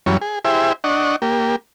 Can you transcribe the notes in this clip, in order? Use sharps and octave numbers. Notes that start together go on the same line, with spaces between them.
F#2 E3 F#3 G3 C#4 C#6
G#4
E4 G4 G#4 C5 E5
D4 D#5 F#5 C#6
A#3 G4